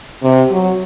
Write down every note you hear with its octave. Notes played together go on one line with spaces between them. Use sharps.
C3
F#3